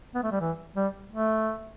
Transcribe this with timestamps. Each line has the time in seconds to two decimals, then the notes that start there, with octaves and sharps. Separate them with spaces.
0.15 B3
0.23 A3
0.32 G3
0.41 E3
0.76 G3
1.12 A3